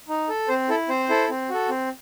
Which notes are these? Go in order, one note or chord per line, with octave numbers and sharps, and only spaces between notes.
D#4
A4
C4 C5
E4 A4
C4 C5
E4 A4
C4
F#4 A4
C4